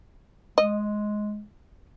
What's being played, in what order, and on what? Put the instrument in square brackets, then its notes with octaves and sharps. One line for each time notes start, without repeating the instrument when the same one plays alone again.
[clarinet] G#3 [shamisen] D#5